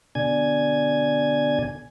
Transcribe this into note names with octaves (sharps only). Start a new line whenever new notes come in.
B2 D3 D5 G#5 G#6